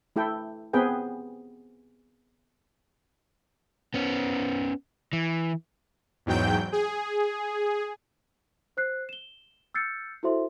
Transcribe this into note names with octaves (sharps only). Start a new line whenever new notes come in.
A3 E4 A4 G5
B3 C4 G#4 B4 G5
B3 C#4
E3
E2 G#2 F#3 G5 G6
G#4
C5 F#6 C7
E7 G7
E6 F6 G6 A6 C7 C#7
E4 F#4 A4 C5 E5 C6